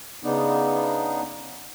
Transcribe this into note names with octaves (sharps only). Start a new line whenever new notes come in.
C#3 B3 D4 D#4